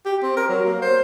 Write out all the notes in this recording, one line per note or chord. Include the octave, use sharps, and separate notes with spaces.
G4
C4
A#4
F#3
A#3
C5